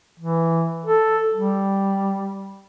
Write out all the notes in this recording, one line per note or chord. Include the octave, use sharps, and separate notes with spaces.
E3
A4
G3